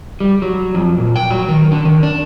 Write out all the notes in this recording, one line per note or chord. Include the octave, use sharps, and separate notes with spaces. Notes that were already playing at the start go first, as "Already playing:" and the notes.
G3
F#3
F2
A#2
G5
F#3
D#3
D3
D#3
D4